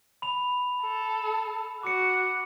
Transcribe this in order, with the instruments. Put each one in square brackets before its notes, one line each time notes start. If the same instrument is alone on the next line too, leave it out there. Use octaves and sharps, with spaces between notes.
[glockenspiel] B5 F7
[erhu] A4
[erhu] F#4 [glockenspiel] D6 C#7